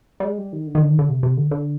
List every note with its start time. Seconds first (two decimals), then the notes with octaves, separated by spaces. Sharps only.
0.20 G3
0.25 G#3
0.38 G3
0.53 D#3
0.67 D3
0.75 D#3
0.82 D3
0.90 D#3
0.99 D3
1.09 C3
1.23 C3
1.37 D3
1.51 D3